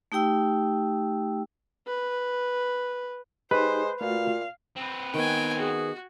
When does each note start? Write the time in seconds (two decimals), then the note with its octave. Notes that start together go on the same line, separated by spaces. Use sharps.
0.12 A3 D#4 G4 G5 E6
1.87 B4
3.51 G#3 D#4 G4 B4 C5
4.01 A#2 A3 F4 F#4 F5
4.76 C4 B4
5.14 D#3 B3 G5 G#5
5.58 F#4 G#4